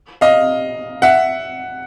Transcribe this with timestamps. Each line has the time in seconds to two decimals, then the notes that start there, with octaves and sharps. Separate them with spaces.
0.21 D#5 F5
1.02 E5 F#5